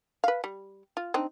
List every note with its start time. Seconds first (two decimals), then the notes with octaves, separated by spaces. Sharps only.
0.24 B4 F5
0.44 G3
0.97 F4
1.14 C4 D4 D#4